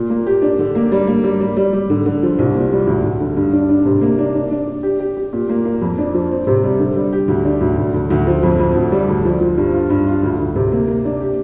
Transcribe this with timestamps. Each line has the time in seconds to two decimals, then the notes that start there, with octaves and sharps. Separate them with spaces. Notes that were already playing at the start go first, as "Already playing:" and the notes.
Already playing: A#2
0.10 A#3
0.26 G4
0.42 D4
0.59 D3
0.75 A#3
0.92 G3
1.07 A#3
1.24 G3
1.40 G3
1.57 G3
1.73 G3
1.90 D3
2.06 D3
2.23 F3
2.39 C2
2.54 A#2
2.72 G3
2.87 D2
3.04 D2
3.20 D3
3.37 G2
3.53 D4
3.69 D4
3.86 C3
4.01 A#3
4.19 D4
4.35 D4
4.51 D4
4.67 D4
4.83 G4
5.00 G4
5.17 G4
5.33 A#2
5.49 A#3
5.65 A#3
5.82 F2
5.98 D4
6.14 F3
6.31 C4
6.47 C3
6.63 G3
6.79 D3
6.96 G3
7.12 G4
7.28 D2
7.45 D4
7.61 D2
7.78 D2
7.94 D2
8.10 D2
8.27 F3
8.43 F2
8.60 F2
8.75 D2
8.92 G3
9.08 D2
9.25 F3
9.41 F3
9.58 G2
9.74 F4
9.90 G2
10.07 F4
10.23 D2
10.39 D2
10.56 C3
10.72 A#3
10.88 A#3
11.05 D4
11.21 G4